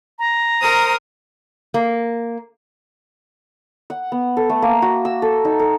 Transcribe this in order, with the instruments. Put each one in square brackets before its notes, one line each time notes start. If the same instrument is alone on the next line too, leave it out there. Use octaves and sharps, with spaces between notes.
[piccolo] A#5
[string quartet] A#4 C5 D#6
[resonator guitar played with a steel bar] A#3
[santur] F#5
B3
A4
A3
A#3
F#4
E6
A4
D#4
A4